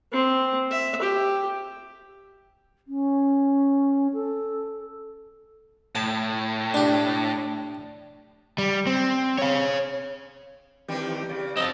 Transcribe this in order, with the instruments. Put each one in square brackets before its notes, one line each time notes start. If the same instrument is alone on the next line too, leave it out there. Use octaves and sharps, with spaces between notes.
[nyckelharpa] C4
E5
G4
[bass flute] C#4
A4
[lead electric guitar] A2 [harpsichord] A5
[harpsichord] D4 G4
[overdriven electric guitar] G3
C4
C#5 F5
[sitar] D#3 G3 A3 [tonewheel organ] E3 C4 G4
[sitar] C#3 [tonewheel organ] D5
[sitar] F3 F#3 [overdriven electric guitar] C4 A4 [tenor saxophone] D#5